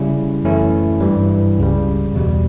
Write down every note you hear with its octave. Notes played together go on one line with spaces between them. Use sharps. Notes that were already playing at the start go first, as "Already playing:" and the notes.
Already playing: C#3 G3 C#4 E4
F#2 E3 A3 C#4 E4
G2 E3 G3
C#2 C#3 G3
E2 B2 G3